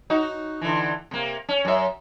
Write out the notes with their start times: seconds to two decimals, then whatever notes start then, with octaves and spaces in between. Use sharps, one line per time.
0.10 D#4 F#4
0.61 D3 E3
1.11 C3 A#3
1.49 C#4
1.65 F#2 E5